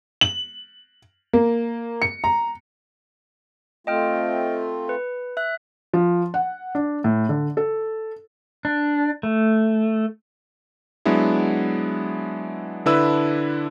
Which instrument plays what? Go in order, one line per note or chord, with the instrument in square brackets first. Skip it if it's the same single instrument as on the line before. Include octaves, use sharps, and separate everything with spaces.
[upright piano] F#7
A#3
C#7
A#5
[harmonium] A3 C4 F4 [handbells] D#5 G5 F6
[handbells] B4
E5 F#6
[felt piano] F3
F#5
D4
A2
D3
A4
[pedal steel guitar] D4
A3
[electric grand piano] F#3 G#3 B3 D4 E4
D3 D4 E4 B4 E6